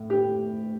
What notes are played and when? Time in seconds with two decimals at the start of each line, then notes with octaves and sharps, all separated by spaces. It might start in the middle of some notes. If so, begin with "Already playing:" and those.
Already playing: A2
0.10 G4